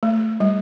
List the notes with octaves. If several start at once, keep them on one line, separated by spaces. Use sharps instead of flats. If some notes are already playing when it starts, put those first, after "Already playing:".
A3
G3